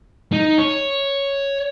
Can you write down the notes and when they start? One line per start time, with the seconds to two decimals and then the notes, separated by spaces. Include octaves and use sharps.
0.33 D#4
0.58 C#5